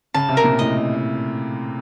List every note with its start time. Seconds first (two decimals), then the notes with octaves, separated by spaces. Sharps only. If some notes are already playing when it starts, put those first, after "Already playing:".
0.14 C#3 A5
0.29 C3
0.37 A#4
0.44 A#2
0.59 A2 D#5